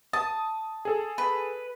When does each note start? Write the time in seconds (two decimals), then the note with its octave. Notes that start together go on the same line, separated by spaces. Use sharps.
0.13 A5 D#6
0.85 G#4 A4
1.18 B4